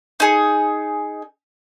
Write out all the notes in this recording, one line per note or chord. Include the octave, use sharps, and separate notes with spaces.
D#4 G#4